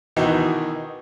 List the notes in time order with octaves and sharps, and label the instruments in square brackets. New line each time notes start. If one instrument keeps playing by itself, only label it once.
[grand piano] B2 D#3 E3 D#4 F#4